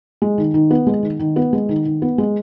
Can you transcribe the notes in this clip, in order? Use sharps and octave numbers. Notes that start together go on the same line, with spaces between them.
G#3
D#3
D#3
B3
G#3
D#3
D#3
B3
G#3
D#3
D#3
B3
G#3